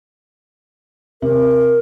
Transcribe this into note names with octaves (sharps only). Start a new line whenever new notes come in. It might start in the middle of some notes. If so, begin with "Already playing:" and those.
C3 A#4